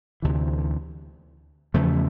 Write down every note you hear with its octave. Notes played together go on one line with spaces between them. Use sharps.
D2 C3 E3
E2 C#3 F3 A3